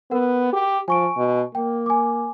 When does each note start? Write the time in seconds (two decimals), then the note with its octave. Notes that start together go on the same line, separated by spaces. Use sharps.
0.11 B3 A#4 F#5
0.53 G4
0.88 F3 G#5 C#6 D7
1.17 B2
1.55 A#3 G5
1.86 G#5 D6